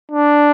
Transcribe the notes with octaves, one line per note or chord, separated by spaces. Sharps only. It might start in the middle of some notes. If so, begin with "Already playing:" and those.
D4